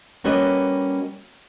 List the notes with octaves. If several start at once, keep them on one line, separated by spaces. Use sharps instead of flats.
G3 A#3 C#4 F#4 B4 D#5